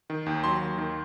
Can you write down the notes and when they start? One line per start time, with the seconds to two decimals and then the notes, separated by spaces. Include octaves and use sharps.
0.10 D#3
0.26 D#2
0.44 F#3 C6
0.61 D#2
0.78 D#3